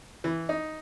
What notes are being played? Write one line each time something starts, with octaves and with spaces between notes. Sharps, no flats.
E3
D#4